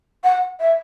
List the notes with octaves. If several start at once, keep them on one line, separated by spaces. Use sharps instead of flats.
F#5
E5